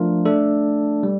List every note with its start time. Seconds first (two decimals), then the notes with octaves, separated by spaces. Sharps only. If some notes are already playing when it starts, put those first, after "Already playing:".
Already playing: F3 A3 D4 F4 A#4
0.25 A3 D4 A4
1.03 G3